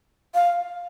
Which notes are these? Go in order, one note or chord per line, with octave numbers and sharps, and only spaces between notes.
F5